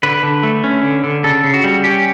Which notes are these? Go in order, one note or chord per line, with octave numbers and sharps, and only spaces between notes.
D3 B4
D3
A3
C#4
D3
D3
C#3 A4
C#3
F#4
G3
C#4 G4